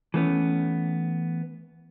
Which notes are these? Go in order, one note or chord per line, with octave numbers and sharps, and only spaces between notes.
E3 A3 B3 C#4